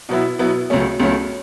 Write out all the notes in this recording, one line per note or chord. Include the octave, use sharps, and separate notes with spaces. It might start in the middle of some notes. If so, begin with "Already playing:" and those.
B2 F#3 B3 E4
B2 F#3 B3 E4
C#2 C#3 F#3 A3 C#4
C#2 C#3 F#3 A3 C#4